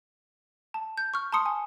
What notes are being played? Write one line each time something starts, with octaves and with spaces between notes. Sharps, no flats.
A5
G6
C#6 F6
A5 A#5 C6 D#6 C#7
G#5